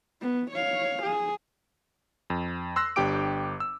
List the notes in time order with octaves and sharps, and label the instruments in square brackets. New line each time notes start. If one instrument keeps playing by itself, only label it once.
[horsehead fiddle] B3
C#5 F5
G#4
[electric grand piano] F2
C6 E6 F#6 A#6
G1 D4 G4 G5 D6 D7
E6